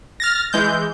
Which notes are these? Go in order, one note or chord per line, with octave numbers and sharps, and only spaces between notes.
F6 A6 A#6
E3 G#3 G6